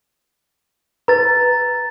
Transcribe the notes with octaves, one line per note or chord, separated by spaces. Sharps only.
B4 A#5 A6